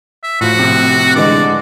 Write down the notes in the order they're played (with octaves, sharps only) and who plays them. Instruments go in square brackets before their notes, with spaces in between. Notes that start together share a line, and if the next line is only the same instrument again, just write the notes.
[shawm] E5
[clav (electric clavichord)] A2 F3 [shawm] F#4
[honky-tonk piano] C3
[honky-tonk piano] D3 E3 G#3 [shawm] D5